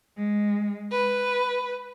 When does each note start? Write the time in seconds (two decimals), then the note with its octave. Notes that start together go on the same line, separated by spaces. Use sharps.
0.17 G#3
0.92 B4